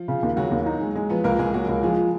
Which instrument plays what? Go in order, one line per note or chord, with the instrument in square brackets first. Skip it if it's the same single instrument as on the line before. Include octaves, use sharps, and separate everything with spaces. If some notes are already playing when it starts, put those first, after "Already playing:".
Already playing: [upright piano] F3 F4
[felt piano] C#3
D#2
[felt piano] C#3 [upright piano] F#3 F#4
[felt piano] D#2
D#4
G#3
G#3
[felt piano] F3 [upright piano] B3 B4
[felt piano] C#2 [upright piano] A#3 A#4
[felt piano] C#2 [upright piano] G#3 G#4
[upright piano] F#3 F#4 [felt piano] A#3
[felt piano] C#2
[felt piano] F3 [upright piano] G#3 G#4